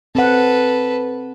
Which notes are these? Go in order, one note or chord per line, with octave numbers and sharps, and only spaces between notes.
C4 A4 B4 F#5